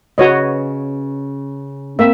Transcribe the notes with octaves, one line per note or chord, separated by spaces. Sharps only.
C#3 C#4 F#4 B4 C#5 D#5
A#3 C4 E5